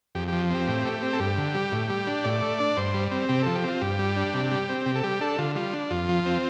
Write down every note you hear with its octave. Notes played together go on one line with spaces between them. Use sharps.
F2 G4
F3 G4
C4 G4
A2
A3
C4
A4
G2 G4
D3
G3
A2
G3
D4
A2 D5
A3
D4
G2 C5
G3
C4
C3 G4
F3 A4
G4
C4 F4
G2 G4
G3
D4
C3
G3
C4
C3 G4
A4
G3 G4
D4 A4
D3 F4
G3 F4
D4
F2 F4
F3
C4